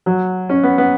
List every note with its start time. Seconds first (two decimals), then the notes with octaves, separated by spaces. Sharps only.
0.06 F#3
0.49 C#4
0.63 B3
0.78 B3